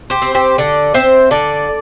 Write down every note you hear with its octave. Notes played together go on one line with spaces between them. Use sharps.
G4 C5
C4
G4 C5
D3 A4 D5
C4 C5 E5
D3 A4 D5